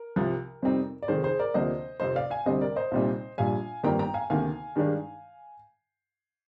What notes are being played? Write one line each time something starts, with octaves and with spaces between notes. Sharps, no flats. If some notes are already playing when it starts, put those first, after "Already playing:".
Already playing: A#4
C2 C3 F3
F2 C3 G3 C4 D#4
D5
F1 F2 D#3 G#4 C5
G#4 C5
A#4 D5
D2 C3 F3 A#3 D4 C5 D#5
F1 F2 C3 C5 D#5
D5 F5
F5 G#5
D2 C3 G3 C4 C5 D#5
A#4 D5
C5 D#5
C2 A#2 G3 C4 D#4
A#1 A#2 G3 F5 G#5
G1 F2 D#3 G3 A#3 G5 A#5
G5 A#5
F5 G#5
D2 C3 D#3 A#3 F5 G#5
G2 D#3 G#3 D4